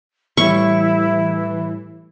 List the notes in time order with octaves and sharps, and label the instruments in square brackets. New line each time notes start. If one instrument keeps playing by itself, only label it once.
[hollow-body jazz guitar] A2 G3 [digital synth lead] E3 [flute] E4 [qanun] C#6